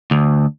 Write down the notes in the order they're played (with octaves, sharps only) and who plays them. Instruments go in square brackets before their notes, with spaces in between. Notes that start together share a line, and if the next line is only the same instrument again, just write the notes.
[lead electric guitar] D2